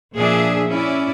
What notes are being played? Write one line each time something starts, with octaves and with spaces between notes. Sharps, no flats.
A#2 F3 D4 G#4 E5
C#4 E4 D5